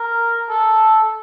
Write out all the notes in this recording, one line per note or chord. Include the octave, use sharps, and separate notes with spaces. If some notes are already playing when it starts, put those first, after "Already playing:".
Already playing: A#4
A4